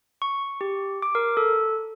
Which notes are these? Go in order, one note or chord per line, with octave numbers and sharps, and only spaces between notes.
C#6
G4
D6
A#4
A4